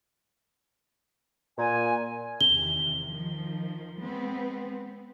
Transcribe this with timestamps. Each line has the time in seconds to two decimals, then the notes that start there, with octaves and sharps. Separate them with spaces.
1.57 A#2 G#5
2.41 E2 C3 D#3 G7
3.08 D#3 F3
4.01 G#3 B3 C4